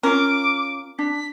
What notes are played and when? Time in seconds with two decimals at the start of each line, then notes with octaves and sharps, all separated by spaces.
0.03 C#4 F4 A#4 D6
0.99 D4 B6